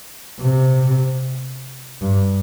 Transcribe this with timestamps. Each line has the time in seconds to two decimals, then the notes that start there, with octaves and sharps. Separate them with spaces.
0.40 C3
2.02 G2